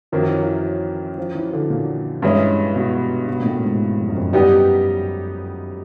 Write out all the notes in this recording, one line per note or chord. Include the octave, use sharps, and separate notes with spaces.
F#2 D#3 F3 F#3 A#3
E3
F3
F3
E3
D3
A#2
G2 E3 G#3 C#4
B2
B2
A#2
A2
G#2
F2
F#2
F2
F#2 G3 B3 D#4 G4